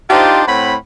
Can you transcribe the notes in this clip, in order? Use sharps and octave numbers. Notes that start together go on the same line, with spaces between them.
D4 D#4 F4 G4 C5
A2 C4 F#5 B5